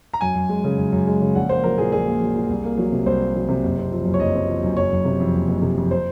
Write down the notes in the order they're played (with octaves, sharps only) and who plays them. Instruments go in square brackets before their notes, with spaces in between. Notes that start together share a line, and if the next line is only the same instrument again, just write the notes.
[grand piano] A#5
F#2 G#5
F#2
G#3
C#3
F#2
F#2
G#3
C#3
A#1 F#5
A#3 C5
F#3 A#4
A#2 G#4
A#1 G#4
A#3
F#3
A#2
C2
A#3
F#3
C3
C2 C5
A#3
F#3
C3
F#1
C4
F3
F#2
C#5
F#1 D#5
C4
F3
F#2
F#1 C#5
F#1
C3
F2
F#1
F#1
C3
F2
C5